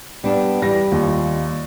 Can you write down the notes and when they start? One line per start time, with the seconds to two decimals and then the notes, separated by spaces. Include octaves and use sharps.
0.24 G3 B3 D4
0.62 E3 G3 A#6
0.92 D#2 F4